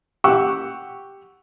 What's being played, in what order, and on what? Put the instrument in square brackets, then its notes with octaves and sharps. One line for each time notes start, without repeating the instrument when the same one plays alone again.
[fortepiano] G4 F#5 C#6 E6